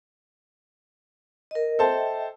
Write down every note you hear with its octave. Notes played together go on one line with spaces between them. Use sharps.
A#4 D#5
A4 C5 D#5 E5 G5 A5